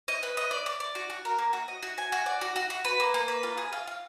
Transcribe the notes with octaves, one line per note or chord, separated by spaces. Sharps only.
D#5
B4
D#5
D5
D5
D5
F#4
F#4
A#4
A#3
F#4
D#5
F#4
G#5
F#4
D5
F#4
F#4
F#4
B4
A#3
A#3
B4
F4
G#4
F4
F4